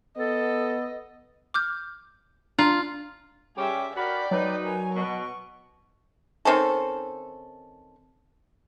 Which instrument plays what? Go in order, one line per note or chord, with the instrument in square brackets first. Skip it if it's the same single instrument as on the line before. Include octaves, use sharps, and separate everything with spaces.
[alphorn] B3 [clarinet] A4 [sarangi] D#5
[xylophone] D6 F6 G6
[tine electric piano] D4 [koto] F4 [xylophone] A#5
[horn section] G3 C#4 G4 [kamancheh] G#4 E5
[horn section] F#4 A#4 B5 [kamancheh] D5 G5
[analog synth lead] F#3 [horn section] D#4 B4
[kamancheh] A#4 G#5
[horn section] B2 [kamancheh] C#6
[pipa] D#3 C4 C#4 A4